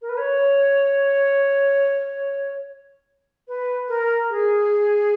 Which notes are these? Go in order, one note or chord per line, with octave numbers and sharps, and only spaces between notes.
A#4
B4
C#5
B4
A#4
G#4